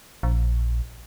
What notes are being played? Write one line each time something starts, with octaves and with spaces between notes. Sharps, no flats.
A#1